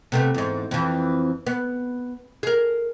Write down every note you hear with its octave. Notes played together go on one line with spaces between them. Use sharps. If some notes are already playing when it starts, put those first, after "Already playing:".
C3 A3 B3
E2 G#2
F2 E3
B3
G#4 A#4